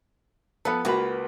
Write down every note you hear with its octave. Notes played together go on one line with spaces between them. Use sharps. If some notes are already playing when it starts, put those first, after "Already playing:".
F3 B3 A4 B4
C#2 A#3 F#4 B4 A#5 B5